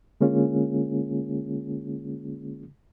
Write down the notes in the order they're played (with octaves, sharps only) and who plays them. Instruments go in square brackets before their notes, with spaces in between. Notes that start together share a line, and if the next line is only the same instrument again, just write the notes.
[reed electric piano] D3 G#3 A#3 C#4 F4 G#4